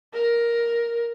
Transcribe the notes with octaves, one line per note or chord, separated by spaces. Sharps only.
A#4